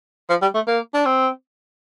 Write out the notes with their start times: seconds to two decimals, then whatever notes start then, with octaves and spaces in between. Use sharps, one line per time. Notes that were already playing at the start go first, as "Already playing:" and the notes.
0.30 F3
0.42 G3
0.54 A3
0.67 A#3
0.94 D4
1.05 C4